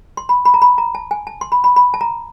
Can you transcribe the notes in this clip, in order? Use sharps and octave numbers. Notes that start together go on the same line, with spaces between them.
C6
B5
B5
A#5
B5
A#5
A5
G#5
A5
C6
B5
B5
B5
A5
A#5